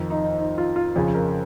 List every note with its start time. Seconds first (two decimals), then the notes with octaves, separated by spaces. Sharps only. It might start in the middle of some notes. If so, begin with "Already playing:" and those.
Already playing: F2 D#3
0.10 D#4
0.38 D#4
0.58 F4
0.76 F4
0.96 F2 C#3 G#4
1.14 A#4